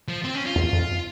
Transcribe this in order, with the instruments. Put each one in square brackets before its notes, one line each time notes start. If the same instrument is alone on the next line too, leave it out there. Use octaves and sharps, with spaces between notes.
[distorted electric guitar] F3
C4
C#4
F4
[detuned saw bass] E2
F2